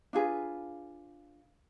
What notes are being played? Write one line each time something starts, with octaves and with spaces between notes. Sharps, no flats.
D4 F4 G#4 B4